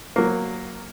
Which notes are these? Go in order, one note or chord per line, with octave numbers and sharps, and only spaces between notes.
F#3 A#3